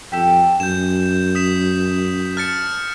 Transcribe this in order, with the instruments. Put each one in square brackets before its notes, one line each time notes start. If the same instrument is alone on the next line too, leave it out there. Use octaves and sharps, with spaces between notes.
[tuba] F2 [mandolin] G4 A4
[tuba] F#2 [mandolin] G#5 [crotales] G6 E7
[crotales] D#6 B6 E7
[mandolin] A5 [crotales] F6 A6 C#7